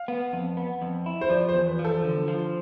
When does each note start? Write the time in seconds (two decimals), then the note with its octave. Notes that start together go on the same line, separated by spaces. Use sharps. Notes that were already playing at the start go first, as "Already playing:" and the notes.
Already playing: F5
0.08 B3
0.33 F2
0.57 B3
0.82 F2
1.06 E4
1.21 C5
1.30 F3 D5
1.49 C5
1.54 E2
1.67 B4
1.79 F3
1.85 A4
2.04 D3
2.28 F3